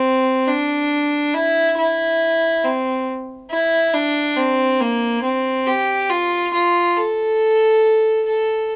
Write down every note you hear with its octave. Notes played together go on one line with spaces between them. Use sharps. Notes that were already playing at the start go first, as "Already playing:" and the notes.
Already playing: C4
D4
E4
E4
C4
E4
D4
C4
A#3
C4
G4
F4
F4
A4
A4